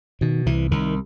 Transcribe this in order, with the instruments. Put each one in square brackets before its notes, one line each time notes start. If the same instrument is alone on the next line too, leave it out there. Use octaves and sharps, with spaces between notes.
[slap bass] B2 D#3
C2 E3
C2 D#3